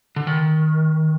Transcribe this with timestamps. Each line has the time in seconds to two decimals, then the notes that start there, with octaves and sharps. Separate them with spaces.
0.16 D3
0.27 D#3